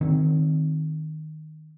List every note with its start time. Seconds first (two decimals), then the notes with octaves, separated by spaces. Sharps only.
0.01 D#3 C4